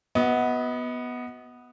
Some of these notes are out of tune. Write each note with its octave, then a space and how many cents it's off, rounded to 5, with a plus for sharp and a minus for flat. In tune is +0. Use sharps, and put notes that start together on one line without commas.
B3 -5 F#4 +0 D#5 +35